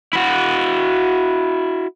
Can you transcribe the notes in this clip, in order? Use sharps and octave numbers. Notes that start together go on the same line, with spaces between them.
E4 F#4